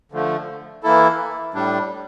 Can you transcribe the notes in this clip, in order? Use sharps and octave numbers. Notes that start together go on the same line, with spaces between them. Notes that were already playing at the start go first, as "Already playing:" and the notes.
D3 F3 A3
E3 A#3 E4 A4
A2 G3 D4